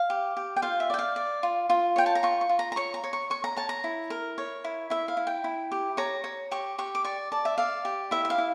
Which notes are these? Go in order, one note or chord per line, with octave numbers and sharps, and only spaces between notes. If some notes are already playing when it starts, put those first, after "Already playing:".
Already playing: F5
G4
G4
G5
F4 F5
E5
D5 G5
F5
D5
F4
F4
C#5 G5
A5
A#5
F4 C#6
C#6
F4
A#5
A#5
C#5 C#6
A#5
C#5
C#6
C#5 C#6
A#5
C#5 A5
A#5
E4
A#4
C#5
E4
E4 E5
F5
E4
G5
E4
G4
C#5 A#5
C#5
G4 C#6
G4 C#6
D6
D5 C#6
D5 A5
E5
D5 F5
G4
E4 E5
E5
F5
E4